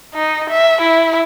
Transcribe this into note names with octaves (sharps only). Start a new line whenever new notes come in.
D#4
E5
E4